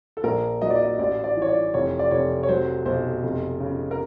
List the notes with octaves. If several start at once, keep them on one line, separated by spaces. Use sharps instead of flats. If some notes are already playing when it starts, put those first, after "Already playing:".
A4
A#1 A#4
F#3 D#5
D5
D#5
A1 D5
D5
E3
C#5
D5
F1 C#5
D5
F1 C#5
C#5
F#3 C5
B1 C5
F1
C#3
A#4